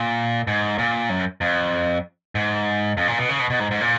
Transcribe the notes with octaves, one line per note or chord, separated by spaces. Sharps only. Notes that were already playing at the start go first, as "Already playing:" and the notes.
Already playing: A#2
G#2
A#2
F#2
F2
G#2
F2
A#2
B2
C#3
B2
B2
G#2
G#2
A#2